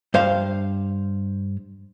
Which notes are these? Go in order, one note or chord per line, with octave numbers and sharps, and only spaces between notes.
G2 C5 F5